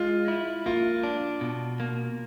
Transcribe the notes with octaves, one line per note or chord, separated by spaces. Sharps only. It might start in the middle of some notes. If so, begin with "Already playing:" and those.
Already playing: G#3 F4
E4
A#3 F4
D4
B2
A#3